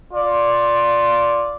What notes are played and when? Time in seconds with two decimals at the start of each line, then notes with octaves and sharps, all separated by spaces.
0.13 F4 D5